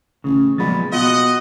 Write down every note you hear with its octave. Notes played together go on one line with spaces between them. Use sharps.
A1 C#3
A#2 F3 F#3 G#3 B3 B5 A6
B2 B3 F4 D#5 F#5